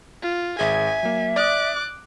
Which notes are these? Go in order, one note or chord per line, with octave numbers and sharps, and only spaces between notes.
F4
G#1 G#4 E5 G#5
F#3 A#3
D5 D6 D#6 F#6